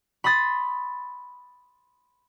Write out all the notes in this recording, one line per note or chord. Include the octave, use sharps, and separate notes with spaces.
B5 C6 D#6 A6